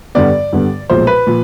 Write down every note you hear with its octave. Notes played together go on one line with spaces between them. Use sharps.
G2 D3 G3 B3 D5
G2 D3 G3 B3
B1 A#2 F3 G#3 C5
B4
A#2 F3